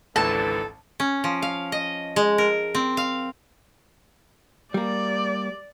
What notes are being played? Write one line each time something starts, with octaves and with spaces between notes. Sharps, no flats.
G#1 C#2 D3 E3 A4 A5
C#4
F3
F5
D#5
G#3
A#4
C4
F5
G3 A#3 D5